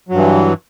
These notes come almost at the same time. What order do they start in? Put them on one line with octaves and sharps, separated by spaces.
F#3 G2 E3